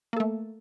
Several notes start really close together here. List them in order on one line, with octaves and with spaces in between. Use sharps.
A#3 A4 A3